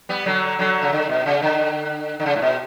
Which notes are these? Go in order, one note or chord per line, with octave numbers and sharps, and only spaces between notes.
G3 B3
D3 F#3
D3 F#3
C#3
D3
B2
C#3
D3
D3
C#3
A2
B2